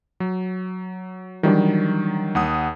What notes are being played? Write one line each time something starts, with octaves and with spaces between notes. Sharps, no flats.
F#3
D#3 E3 F#3 G3 D4
D#2 F#5 D#6